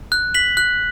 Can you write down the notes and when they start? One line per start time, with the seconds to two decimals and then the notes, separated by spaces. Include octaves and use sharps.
0.12 F#6
0.34 B6 F#7
0.57 F#6